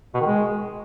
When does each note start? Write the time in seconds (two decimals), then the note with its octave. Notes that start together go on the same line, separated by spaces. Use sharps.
0.14 B2
0.20 D#3
0.27 G#3